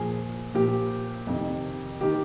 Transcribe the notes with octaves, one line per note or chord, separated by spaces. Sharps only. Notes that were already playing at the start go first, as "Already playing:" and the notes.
Already playing: A#2 F3 G#4
A#2 F3 G4
F2 C3 D#3
D#3 G4